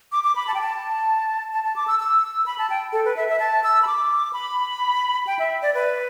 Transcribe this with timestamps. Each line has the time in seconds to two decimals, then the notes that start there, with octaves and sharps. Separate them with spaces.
0.12 D6
0.24 D6
0.36 B5
0.47 A5
0.54 G5
0.61 A5
1.52 A5
1.64 A5
1.76 D6
1.88 E6
2.00 E6
2.46 B5
2.58 A5
2.70 G5
2.93 A4
3.05 B4
3.16 E5
3.29 E5
3.40 A5
3.64 E6
3.82 B5
3.87 D6
4.33 B5
5.27 G5
5.39 E5
5.62 D5
5.74 B4